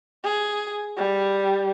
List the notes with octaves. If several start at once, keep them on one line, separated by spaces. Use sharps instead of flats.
G#4
G3